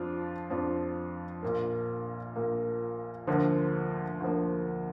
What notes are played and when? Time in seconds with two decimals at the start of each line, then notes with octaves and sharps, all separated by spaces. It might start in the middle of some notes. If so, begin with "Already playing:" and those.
Already playing: F2 F3 D4 F4
0.50 F2 F3 D4 F4
1.42 A#1 A#2 A#3
2.36 A#1 A#2 A#3
3.27 D2 D3 F3 A#3
4.20 D2 D3 F3 A#3